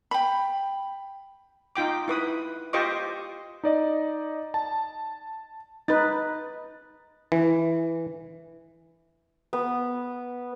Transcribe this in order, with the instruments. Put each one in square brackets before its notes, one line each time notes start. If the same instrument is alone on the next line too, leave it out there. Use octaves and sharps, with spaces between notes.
[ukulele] G5 B5
[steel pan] D#4 F4 G5 D6
E4 B4 D#6
F4 G4 C5 D#5 C#6 D6
[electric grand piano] D#4 D5 D#5
A5
[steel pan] D#4 B4 [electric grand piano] A6
[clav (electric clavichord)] E3
[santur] B3